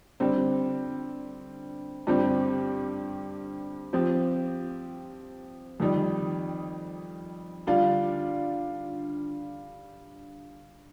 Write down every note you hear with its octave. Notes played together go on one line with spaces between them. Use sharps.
D3 G3 C4
G2 D3 G3 C4 G4
F3 C4 G4
F2 D#3 G3
D3 G3 D4 F4